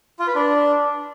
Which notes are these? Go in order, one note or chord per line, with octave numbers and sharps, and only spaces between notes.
F4
B4
D4